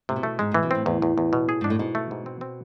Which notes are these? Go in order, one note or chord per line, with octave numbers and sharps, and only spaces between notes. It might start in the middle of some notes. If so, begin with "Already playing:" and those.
A2 C3
B2
A3
G#2 G#3
A2 E3
B2
A2 C4
E2 A2
E2
E2
B2
G#4
G#2 D4
A2
G#2 B2
A3
G#2
C4
C4